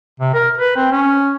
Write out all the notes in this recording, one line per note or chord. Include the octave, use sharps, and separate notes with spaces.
C3
A#4
B4
C4
C#4